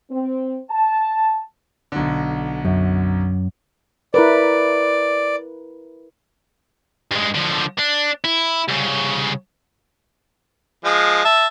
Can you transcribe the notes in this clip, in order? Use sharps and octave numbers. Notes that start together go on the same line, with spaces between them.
C4
A5
B1 D3
F#2
E4 A#4 B4 D5
G2 G#3
D3 F3
D4
E4
C2 C#3
F3 G#3
E5 A5